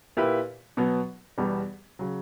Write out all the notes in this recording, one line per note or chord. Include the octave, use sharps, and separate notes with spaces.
A#2 A#3 E4 G4 B4
B2 F#3 B3
E2 B2 G3 B3
C#3 F#3